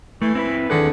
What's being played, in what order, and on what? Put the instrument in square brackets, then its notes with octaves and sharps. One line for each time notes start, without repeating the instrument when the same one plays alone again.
[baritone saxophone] E3 [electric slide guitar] A3
[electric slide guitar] C4 E4 B4
[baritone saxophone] D3 [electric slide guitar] D#3 G#4 B4